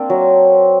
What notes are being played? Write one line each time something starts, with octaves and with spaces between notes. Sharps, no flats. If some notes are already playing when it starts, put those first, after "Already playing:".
Already playing: A#3 C4 D4
F#3